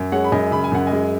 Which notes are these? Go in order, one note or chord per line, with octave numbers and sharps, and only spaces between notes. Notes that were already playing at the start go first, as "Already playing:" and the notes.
Already playing: F#2
G#3 C#5 F#5
B5
F#2 D#5 G#5
C#3 B5
G#5
F#2 F#5
D#5 G#5
G#3